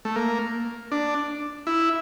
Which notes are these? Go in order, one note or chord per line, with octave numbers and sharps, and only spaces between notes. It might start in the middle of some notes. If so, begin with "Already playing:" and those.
A3
A#3
D4
E4